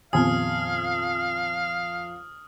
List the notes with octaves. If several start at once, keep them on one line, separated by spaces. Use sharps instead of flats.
F2 A#2 D#3 B3 F5 G#5 D#6 F6